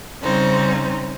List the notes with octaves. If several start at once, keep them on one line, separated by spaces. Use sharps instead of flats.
C#3 G3 C4 C#4 D#4 C5